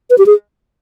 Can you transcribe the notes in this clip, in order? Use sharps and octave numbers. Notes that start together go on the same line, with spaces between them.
B4
G4
G#4